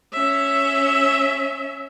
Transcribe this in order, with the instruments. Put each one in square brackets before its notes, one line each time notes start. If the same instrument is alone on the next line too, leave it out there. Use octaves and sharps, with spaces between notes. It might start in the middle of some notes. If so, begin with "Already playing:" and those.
[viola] C#4 E5